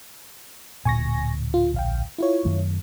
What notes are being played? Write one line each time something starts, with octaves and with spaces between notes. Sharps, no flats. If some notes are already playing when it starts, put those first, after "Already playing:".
D1 A#2 G#5 C#6 A#6
F4
A#1 F5 G5
E4 F4 C#5
F#2 D#3 A3